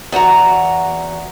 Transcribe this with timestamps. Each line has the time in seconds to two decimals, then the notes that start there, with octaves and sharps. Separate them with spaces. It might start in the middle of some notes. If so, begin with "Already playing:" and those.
0.12 E2 F#4 F#5 A#5